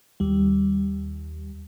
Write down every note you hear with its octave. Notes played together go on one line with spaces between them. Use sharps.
D#2 G3